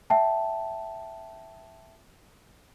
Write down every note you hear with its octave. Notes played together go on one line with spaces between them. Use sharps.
E5 G5 A5